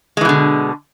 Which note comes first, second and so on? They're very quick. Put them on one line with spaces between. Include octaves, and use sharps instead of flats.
G#3 E3 B2 D3